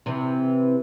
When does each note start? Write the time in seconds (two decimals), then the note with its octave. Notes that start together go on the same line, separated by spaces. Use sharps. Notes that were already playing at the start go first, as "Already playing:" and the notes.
0.06 C3 E3